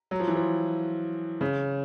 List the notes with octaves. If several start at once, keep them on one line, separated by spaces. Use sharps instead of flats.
F#3
F3
E3
F3
C#3